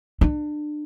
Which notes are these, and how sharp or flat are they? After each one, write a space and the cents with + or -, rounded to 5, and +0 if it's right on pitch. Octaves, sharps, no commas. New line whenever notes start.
D4 +25